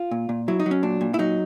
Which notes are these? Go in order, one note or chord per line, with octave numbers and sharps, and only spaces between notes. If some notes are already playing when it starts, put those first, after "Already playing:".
Already playing: F4
A#2
A#2
F#3 E4
D#4
F#3
C#4
A#2 D4
A#2
E4
F#3 D#4